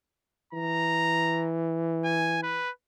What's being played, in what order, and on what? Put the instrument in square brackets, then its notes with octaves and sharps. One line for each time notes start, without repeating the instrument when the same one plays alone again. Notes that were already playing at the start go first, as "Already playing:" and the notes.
[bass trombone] E3 [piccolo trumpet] A#5
[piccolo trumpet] G#5
B4